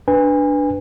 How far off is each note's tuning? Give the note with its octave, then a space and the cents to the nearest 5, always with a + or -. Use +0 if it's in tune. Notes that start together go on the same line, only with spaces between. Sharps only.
D4 +0 B4 +0 G#5 -30